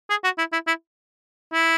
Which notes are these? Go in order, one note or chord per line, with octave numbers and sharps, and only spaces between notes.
G#4
F#4
E4
E4
E4
E4